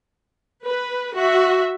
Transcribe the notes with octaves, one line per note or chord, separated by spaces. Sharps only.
B4
F#4 E5